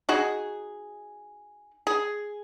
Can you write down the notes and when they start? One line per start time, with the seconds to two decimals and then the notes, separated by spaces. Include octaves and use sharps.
0.09 D#4 F#4 G#4
1.87 G#4